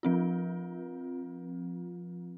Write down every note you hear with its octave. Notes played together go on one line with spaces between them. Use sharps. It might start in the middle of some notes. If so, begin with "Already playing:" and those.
F3 C4 F4